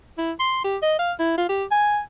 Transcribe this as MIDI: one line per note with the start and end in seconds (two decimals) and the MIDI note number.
0.18 0.32 64
0.39 0.63 84
0.64 0.77 67
0.82 0.95 75
0.99 1.12 77
1.19 1.35 64
1.38 1.45 65
1.49 1.64 67
1.71 1.99 80